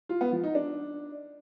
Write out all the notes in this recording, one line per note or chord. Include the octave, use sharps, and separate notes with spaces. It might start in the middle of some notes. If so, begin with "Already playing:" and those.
F4
B3
F3
D#4
D4